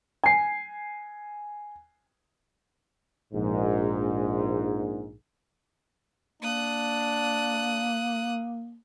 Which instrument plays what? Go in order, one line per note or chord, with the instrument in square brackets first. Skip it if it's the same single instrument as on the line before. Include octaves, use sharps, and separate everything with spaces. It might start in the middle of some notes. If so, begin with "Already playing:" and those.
[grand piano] G#5 C7
[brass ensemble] A#1 G#2
[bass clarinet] A#3 [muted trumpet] D4 [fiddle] D#6 F#6